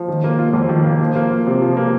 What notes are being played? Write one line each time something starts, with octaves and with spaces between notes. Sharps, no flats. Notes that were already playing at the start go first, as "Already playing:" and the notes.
Already playing: F3
D#3
A#3
F4
F2
D#3
A#3
F3
A#3
F4
C3
F3
A#3